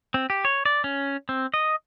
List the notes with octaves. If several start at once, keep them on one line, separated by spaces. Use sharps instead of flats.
C4
G4
C#5
D5
C#4
C4
D#5